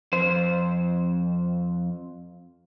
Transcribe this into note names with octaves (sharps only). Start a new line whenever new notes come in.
F2 C5